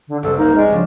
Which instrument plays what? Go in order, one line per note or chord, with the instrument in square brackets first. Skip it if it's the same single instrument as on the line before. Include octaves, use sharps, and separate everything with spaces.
[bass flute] D3
[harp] F#1 C2 [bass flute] A4
[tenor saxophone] A#3 [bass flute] D#4
[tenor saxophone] G#3 [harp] D5 F6
[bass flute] C#3 [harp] F3 F#3 D4